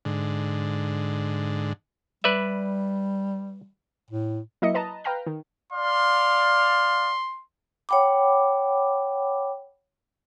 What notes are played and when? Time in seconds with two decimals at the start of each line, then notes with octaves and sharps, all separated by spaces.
0.05 G#2 D3
2.24 G3 B4 D5 E5
4.11 A2
4.62 F#3 A#3 E4 D#5 E5 C#7
4.74 B4 D#5 A5 A#5
5.04 B4 F5 G5 A#5 F6
5.26 D#3
5.72 D5 F5 C6
7.89 C#5 F#5 G5 B5 D6